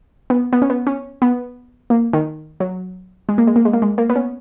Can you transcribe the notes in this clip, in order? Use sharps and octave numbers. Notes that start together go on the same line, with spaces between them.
B3
B3
C#4
B3
C#4
B3
A#3
D#3
F#3
G#3
A#3
G#3
A#3
G#3
A#3
G#3
A#3
B3
C#4